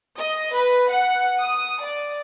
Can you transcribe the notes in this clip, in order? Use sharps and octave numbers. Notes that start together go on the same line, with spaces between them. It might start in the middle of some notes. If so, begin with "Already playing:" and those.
D#5
B4
F#5
D#6
D5